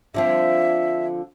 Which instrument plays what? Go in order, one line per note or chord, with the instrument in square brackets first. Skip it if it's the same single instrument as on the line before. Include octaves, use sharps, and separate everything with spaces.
[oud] D3 F3 C4 [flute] E5